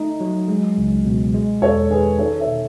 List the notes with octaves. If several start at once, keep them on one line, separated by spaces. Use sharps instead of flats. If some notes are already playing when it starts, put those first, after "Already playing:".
Already playing: A3 D#4 D#5
F#3
G#3
C#2
B2
G#3
E2 A4 C#5
D#3 G#4 B4
D#4 A4 C#5
C#5 E5
B2